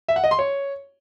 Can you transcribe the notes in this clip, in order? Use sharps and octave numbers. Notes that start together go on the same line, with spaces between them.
E5
F#5
D#5
C6
C#5